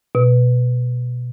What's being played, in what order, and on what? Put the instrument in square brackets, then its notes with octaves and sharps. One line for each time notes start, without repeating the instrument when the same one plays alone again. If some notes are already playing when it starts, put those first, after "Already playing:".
[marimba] B2